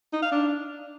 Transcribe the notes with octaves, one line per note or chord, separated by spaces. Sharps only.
D#4
F5
D4